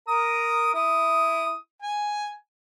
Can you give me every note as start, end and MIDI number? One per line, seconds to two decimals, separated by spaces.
0.08 0.71 70
0.08 0.71 82
0.08 0.71 87
0.74 1.56 64
0.74 1.56 87
1.82 2.33 80